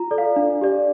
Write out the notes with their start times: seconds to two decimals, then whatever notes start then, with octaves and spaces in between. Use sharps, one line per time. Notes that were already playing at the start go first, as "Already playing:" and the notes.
Already playing: F4 A#5
0.11 A4 D5
0.18 F5
0.36 D4
0.61 G4 D5